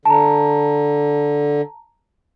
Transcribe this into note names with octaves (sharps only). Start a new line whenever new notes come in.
D3 A5 A#5